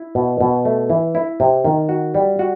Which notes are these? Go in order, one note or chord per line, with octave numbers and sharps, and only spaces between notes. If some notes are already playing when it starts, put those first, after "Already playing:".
Already playing: E4
B2
B2
A3
E3
E4
C3
D#3
F#4
G3
F#4